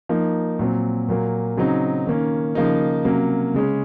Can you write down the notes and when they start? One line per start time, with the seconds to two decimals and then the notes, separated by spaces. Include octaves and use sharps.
0.09 F3 A#3 D#4
0.59 A#2 F#3 C4
1.08 A#2 F#3 A#3
1.57 C#3 F#3 C4 D#4
2.07 D#3 A#3 C#4
2.55 C#3 F3 A#3 D#4
3.05 C3 F#3 A#3 C#4
3.54 C#3 G#3 C#4